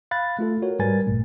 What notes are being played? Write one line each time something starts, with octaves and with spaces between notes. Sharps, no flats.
F5 B5 F#6 A6
A3 F4 A4
F#4 A#4 C#5
G#2 G3 A#4 B4 G#5 A6
A1 G2 A#2 A3